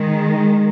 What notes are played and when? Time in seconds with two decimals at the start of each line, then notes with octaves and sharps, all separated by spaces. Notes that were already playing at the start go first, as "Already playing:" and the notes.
Already playing: D#3 G#3